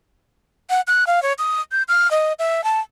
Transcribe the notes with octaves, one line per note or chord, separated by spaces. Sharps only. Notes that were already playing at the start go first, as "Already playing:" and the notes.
F#5
F#6
F5
C#5
D#6
G6
F6
D#5
E5
A5